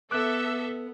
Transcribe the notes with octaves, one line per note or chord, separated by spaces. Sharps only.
B3 A4 E5 D6 F#6